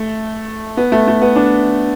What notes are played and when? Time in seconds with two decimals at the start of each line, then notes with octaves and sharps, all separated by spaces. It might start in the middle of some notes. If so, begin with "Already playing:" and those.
Already playing: A3
0.77 B3
0.92 A3
1.08 A3
1.22 B3
1.36 D4